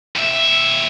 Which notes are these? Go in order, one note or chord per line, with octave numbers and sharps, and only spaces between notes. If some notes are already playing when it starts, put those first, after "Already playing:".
D#2 E5